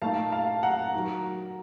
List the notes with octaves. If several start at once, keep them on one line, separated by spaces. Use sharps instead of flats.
A#2 A3 D#4 F5 A5
F5 A5
F#5 A#5
D#3 F#3 A#5